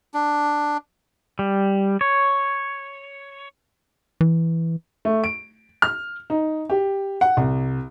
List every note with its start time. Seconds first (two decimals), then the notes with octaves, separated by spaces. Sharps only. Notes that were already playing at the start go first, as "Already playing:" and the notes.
0.14 D4
1.39 G3
2.01 C#5
4.21 E3
5.05 A3
5.24 D7
5.82 F6
6.30 D#4
6.70 G4
7.21 F#5
7.37 C2